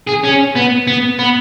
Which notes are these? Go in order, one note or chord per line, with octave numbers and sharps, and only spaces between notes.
G#4
C#4
B3
B3
B3